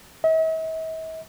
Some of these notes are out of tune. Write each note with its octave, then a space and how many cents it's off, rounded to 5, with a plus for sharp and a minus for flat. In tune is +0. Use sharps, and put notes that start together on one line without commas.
E5 -45